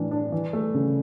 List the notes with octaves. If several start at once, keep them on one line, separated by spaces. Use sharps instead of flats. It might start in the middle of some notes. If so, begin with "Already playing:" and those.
Already playing: A2 E3 D4
D4
E3
A3
C#3